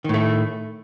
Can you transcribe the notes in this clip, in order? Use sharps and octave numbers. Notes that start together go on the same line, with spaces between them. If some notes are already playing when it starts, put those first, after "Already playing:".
A2 D#3 A3